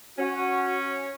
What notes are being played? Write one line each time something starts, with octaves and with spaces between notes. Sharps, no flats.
C#4 F#4